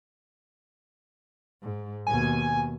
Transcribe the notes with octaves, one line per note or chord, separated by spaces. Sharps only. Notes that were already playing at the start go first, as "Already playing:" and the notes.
G#2
D#2 B2 G#5